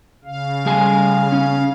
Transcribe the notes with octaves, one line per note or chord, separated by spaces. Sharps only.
C#3 F5
G3 G#4 G#5
C#4